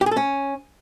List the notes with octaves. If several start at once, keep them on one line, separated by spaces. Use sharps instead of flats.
G4
G#4
A4
C#4